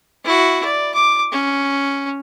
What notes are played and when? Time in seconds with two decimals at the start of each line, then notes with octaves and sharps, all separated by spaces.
0.24 E4 F#4
0.65 D5
0.95 D6
1.32 C#4